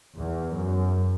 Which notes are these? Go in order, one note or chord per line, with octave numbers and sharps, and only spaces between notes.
E2
F#2